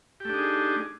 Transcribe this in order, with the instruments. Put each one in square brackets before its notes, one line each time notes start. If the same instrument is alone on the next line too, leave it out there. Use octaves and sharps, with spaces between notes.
[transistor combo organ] G4
A3
D4
D#4
G#4